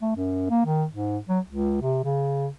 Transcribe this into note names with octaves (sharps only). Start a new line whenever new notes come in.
A3
F#2
A#3
D#3
G#2
F#3
C#2
C3
C#3